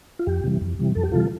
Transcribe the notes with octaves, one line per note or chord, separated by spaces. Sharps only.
F4
F2 G4
C3 E3 G3
F2
C3 E3 G3
F2 A4
G4
C3 E3 G3 F4 A4